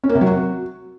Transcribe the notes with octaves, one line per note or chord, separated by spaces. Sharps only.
C#4
A#3
C3
F#3
F#4